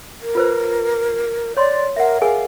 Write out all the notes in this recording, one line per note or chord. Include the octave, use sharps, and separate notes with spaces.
A#4
F4 B4 C5
C#5 D5 C6
A#4 E5 F#5
G#4 A#4 F5 G#5